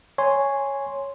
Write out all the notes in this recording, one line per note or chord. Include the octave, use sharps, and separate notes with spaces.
C#5 G#5 C6